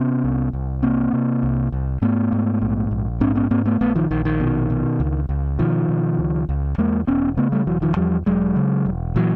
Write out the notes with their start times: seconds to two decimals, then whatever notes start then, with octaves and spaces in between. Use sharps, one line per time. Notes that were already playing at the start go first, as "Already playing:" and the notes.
Already playing: C3 B3 C#4
0.24 C2
0.53 C2
0.83 C3 A#3 C4
1.13 C3
1.43 C2
1.72 C2
2.02 G#2 A3 B3
2.32 G#2
2.62 A#1
2.91 A#1
3.21 G#2 C4 D4
3.36 B3 C#4
3.51 G#2 A#3 C4
3.65 A3 B3
3.81 A#1 A3 B3
3.95 D#3 F3
4.11 A#1 D#3
4.25 D#3
4.40 B2
4.70 B2
5.00 C#2
5.29 C#2
5.59 B2 D#3 F3
5.89 B2
6.19 C#2
6.49 C#2
6.78 E2 G#3 A#3
7.07 E1 B3 C#4
7.37 C#3 A3 B3
7.52 G3 A3
7.67 E1 E3 F#3
7.82 D#3 F3
7.97 E2 F3 G3
8.26 E1 F#3 G#3
8.56 C#3
8.86 E1
9.16 A#2 E3 F#3